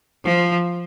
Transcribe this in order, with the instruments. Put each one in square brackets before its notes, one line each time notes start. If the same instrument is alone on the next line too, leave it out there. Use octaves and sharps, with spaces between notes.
[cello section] F3